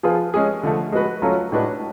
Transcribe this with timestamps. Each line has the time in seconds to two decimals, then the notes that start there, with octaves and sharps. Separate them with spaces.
0.03 F3 B3 F4 G#4
0.34 G#3 C#4 G#4
0.63 D3 F3 A3
0.92 G#3 B3 F#4 B4
1.22 F#3 A3 C#4 F4 A4
1.52 A2 G#3 D4 F#4 B4